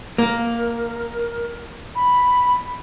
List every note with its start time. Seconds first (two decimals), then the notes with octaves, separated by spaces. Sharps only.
0.18 A#3 A#4
1.95 B5